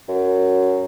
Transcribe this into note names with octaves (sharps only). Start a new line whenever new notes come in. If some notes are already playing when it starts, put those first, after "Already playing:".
F#2